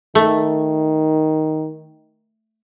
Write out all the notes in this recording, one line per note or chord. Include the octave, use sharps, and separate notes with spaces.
D#3 A3